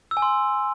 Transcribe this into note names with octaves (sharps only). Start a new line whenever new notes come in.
E6
G#5
C6